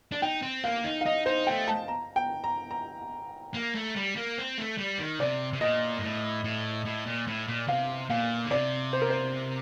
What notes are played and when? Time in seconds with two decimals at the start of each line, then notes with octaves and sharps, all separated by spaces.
0.12 D4
0.22 D#4 G5
0.42 C4
0.64 A#3 F5
0.84 D#4
1.01 F5
1.06 D#4 D#5
1.26 D#4 C5
1.47 A3 G5
1.68 A5
1.88 A#5
2.16 G5
2.44 A#5
2.71 A#5
3.54 A#3
3.75 A3
3.96 G3
4.16 A#3
4.38 C4
4.58 A3
4.78 G3
4.99 D#3
5.19 C3 D5
5.53 C3
5.61 A#2 D#5
5.99 G2
6.02 A2
6.44 A2
6.85 A2
7.06 A#2
7.27 A2
7.48 A#2
7.68 C3 F5
8.10 A#2 F5
8.46 D3
8.51 C3 D5
8.93 C5
9.02 A#4
9.10 C5